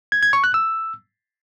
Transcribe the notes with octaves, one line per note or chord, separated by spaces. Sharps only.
G#6
G#6
C#6
F#6
E6